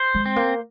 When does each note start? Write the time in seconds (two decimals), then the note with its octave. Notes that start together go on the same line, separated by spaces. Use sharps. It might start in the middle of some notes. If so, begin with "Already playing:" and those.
Already playing: C5
0.14 G#3
0.26 C4
0.36 A#3